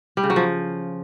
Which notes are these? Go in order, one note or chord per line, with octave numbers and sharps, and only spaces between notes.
G3
C#3
F#3
F3